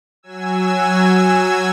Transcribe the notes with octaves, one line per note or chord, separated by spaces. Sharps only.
F#3 G#5 E6